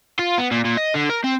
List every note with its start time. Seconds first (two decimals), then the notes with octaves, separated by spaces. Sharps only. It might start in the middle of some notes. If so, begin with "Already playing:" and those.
0.19 F4
0.38 B3
0.51 A#2
0.65 A#2
0.77 D#5
0.94 D3
1.09 A#4
1.24 C4